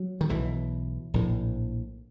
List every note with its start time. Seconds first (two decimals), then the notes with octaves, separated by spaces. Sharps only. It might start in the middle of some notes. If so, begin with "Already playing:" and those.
Already playing: F#3
0.21 D#3
0.29 B1 D3 E3
0.35 B2
1.14 A#1 A2